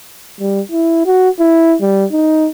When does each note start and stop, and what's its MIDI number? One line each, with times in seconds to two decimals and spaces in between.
0.40 0.60 55
0.71 1.05 64
1.06 1.29 66
1.39 1.75 64
1.81 2.04 55
2.12 2.48 63